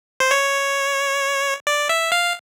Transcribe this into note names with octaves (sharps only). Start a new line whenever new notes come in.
C5
C#5
D5
E5
F5